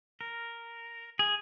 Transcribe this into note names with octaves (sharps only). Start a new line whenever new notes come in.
A#4
G#4